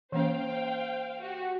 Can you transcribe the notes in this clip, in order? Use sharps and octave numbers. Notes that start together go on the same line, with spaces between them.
E3 A#3 C#4 C5 F5 G5
F#4 G4